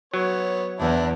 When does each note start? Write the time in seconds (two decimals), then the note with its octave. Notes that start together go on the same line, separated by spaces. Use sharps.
0.14 F#3 B3 C#5
0.80 E2 D4 E4